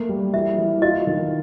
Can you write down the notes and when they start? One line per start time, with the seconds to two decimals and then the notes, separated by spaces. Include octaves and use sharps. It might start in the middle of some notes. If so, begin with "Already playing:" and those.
Already playing: A3 A#3
0.09 G3
0.34 E3 E5
0.58 E3
0.82 F4 D#5
1.07 D#3